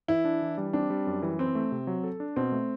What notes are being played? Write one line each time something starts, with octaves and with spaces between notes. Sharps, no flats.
E3 E4
D4
E3
G3
C4 D4
G3
F#2
E3
C4 E4
A3
C3
F#3
A4
D4
B2 C4
A3